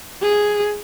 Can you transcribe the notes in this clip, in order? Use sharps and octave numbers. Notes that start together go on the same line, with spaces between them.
G#4